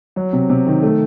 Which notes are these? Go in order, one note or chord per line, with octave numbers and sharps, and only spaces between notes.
F#3
C3
C3
D#3
A3